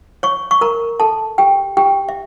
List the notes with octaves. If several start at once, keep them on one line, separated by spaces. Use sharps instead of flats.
C#5 C#6
C#6
A#4 A#5
A4 A5
G4 G5
G4 G5
E5